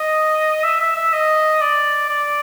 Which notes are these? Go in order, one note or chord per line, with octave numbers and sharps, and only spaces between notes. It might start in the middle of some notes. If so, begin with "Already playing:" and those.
Already playing: D#5
E5
E5
E5
D#5
D5
D5